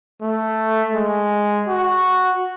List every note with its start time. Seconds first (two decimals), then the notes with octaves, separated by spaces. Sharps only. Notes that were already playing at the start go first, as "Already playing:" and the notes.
0.22 A3
0.95 G#3
1.68 F#4